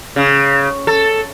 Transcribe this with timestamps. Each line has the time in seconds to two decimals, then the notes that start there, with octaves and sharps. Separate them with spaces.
0.16 C#3
0.87 A4